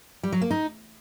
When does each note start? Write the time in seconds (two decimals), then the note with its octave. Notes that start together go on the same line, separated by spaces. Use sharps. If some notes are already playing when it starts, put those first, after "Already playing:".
0.23 G3
0.32 F#3
0.42 A#3
0.51 D#4